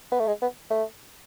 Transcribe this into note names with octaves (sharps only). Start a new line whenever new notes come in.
B3
A3
G#3
B3
A3